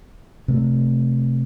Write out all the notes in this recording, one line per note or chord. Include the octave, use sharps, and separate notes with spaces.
C3 A3